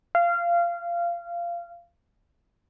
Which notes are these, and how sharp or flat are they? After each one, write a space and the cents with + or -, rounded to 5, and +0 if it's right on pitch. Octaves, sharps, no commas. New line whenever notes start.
F5 -20